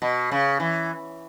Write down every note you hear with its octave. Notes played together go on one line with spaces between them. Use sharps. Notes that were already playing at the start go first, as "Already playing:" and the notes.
B2
C#3
E3